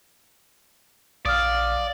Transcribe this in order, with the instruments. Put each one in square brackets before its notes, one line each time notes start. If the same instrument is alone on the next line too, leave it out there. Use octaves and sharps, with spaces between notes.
[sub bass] A#1 [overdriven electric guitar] D5 [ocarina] F5 [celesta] D#6 F6